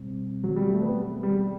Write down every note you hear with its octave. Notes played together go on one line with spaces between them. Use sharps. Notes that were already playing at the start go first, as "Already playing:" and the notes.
Already playing: B2 G3 C4
F#3
G3
A3
B3
G3